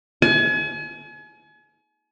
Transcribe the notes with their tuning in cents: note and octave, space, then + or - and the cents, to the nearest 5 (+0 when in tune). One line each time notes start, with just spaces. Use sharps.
G#5 +40